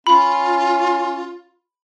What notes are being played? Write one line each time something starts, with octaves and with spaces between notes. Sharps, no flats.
C#4 F4 B5